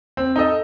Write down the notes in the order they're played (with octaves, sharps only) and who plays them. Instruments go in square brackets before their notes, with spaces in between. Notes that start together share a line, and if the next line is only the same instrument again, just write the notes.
[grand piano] C4
D#4 A4 D#5